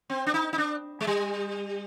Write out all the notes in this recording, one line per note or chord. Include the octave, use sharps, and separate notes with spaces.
C4
D4
D#4
D#4
D4
G#3
G3